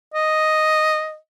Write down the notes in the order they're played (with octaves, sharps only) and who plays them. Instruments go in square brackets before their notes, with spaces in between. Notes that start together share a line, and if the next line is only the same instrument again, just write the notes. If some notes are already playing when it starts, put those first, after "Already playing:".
[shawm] D#5